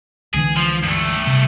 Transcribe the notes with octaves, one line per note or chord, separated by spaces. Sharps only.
C#2 D3 E3 G#4
F3
G2 A3
C3